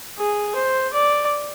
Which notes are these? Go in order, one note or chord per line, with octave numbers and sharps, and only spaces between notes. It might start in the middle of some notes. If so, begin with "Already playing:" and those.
G#4
C5
D5